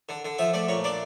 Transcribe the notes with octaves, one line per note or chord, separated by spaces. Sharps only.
D3
D3
F3 E5
A3 D5
A#2 C#5
D4 D5